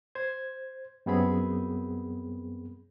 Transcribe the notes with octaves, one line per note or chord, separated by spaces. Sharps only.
C5 G#6
F#2 G3 B3 C4 G#4 B5